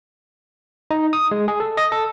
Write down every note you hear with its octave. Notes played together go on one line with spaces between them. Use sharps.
D#4
D#6
G#3
G#4
A4
D#5
A4